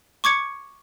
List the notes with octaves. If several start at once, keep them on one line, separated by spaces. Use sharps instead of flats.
C#6 D6 G#6 C#7